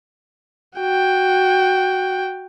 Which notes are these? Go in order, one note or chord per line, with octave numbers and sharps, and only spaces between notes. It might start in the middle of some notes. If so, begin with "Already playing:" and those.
F#4 G5